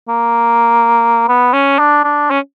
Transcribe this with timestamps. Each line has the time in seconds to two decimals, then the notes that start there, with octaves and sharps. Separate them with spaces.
0.09 A#3
1.28 B3
1.53 C#4
1.79 D4
2.04 D4
2.30 C#4